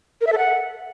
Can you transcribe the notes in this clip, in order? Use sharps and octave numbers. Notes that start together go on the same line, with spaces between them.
A#4
E5
A4
F#5